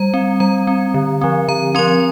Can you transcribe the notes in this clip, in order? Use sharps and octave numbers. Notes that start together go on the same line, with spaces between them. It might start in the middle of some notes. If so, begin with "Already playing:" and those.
Already playing: G3 A#5
C4
G3 A#5
C4
D3
F3 C4
D3 A#5
F3 C4 C6